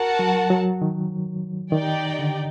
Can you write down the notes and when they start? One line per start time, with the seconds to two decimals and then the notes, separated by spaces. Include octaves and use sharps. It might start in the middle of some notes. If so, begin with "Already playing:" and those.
Already playing: F#4 A#4 F#5 A5
0.19 F#3
0.50 F#3
0.82 D#3
1.72 D#3 D#4 G4 D5 G5
2.19 D3